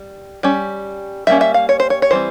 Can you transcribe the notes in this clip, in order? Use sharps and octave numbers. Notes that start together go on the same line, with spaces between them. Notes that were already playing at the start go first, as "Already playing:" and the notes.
Already playing: G3
G3 C#4
G3 A#3 C#4 E5
E5
F5
C#5
C5
C#5
C#5
E3 G3 C4 C5